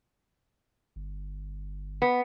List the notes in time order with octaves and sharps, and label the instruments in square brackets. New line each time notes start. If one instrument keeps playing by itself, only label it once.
[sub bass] G1
[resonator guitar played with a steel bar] B3